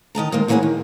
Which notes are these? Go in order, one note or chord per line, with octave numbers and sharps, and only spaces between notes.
D#3 D#5 A5 A#5
D#3 G#3 A#3 A#4
D2 E3 A#3 C#4 G#4 F#5
D#3